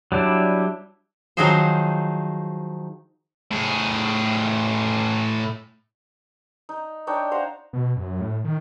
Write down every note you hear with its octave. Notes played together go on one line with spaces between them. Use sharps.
F#3 G3 D4 E4
D#3 F3 F#3 D#4 G#4 C5
A2 G#4
D#4
D4 D#4 C#5 G5
C5 F5 F#5 A#5
B2
F#2
A2
D#3